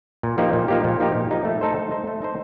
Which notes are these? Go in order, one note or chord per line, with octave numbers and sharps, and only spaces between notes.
A#2
F3 A#3 D#4 G4
A#2
F3 A#3 D#4 G4
A#2
F3 A#3 D#4 G4
A#2
F3 A#3 D#4 G4
A3
D#4 A4 C5
A3
D#4 A4 C5
A3
D#4 A4 C5